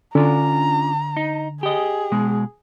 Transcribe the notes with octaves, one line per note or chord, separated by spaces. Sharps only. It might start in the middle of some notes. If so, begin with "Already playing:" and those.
D3 C#4 D4 F4 A#5
D#4
G4 G#4 D#5
B2 G#3